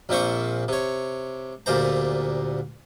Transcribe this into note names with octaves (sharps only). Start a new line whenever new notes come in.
A#1 A#2 C4 C5 C#6
C3 C#5
D2 A#2 G3 C5 A#5